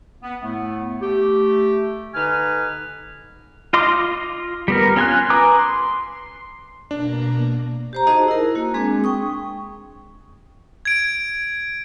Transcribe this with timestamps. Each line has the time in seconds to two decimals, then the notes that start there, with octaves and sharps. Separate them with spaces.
0.22 B3
0.42 A2 A3 B3
1.01 A3 G4
2.14 D3 D#4 B4 G#5 F6
3.73 F4 D#5 C6 D6
4.68 G3 B3 A#4
4.96 C#4 F4 G#5 C6 F#6
5.30 B4 G#5 A#5 D6 D#6
5.59 C6
6.91 B2 A#3 D4 A#5
7.93 G4 C5 A#5
8.07 D#4 F#4 G#4 C5 D#5 A5
8.28 E4 A#4
8.55 A#3 F#4
8.74 G#3 C4 D4 G#4
9.04 G5 C#6 D#6
10.85 G#6 D7